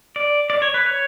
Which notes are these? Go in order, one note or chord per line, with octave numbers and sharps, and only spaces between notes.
D5
D5
C#5
B4
C#5